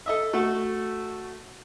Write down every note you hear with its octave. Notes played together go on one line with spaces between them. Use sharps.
A4 D#5 E5
A3 F#4 A4